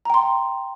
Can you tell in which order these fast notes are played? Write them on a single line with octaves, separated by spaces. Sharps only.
A#5 G5 C6